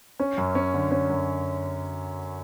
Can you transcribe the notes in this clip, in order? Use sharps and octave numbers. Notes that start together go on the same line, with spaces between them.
C#4
F#2
C#4
D3
C#4
F#2